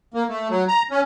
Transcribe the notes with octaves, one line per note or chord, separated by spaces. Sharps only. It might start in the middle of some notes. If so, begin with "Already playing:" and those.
A#3
A3
F#3
A#5
C#4